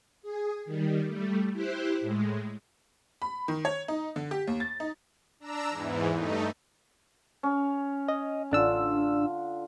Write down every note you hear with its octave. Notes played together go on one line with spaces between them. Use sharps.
G#4
D#3 G3
G3 A3
E4 G4 C5 F#6
A2 G#3
B5
D#3
C#5
D#4
D3
G4
D#2
A6
D#4
D4 A#5 E6
E2 G#2 E3
G2 A3 D#4
C#4
D#5
A1 D3 D4 F4 E6